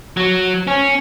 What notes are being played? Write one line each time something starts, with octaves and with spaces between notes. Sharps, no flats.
F#3
C#4